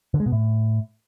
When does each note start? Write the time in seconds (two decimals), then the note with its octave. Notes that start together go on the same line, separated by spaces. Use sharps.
0.14 D3
0.20 G#3
0.26 B2
0.32 A2